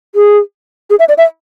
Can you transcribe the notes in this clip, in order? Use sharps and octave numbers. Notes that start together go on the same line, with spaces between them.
G#4
G#4
E5
D5
E5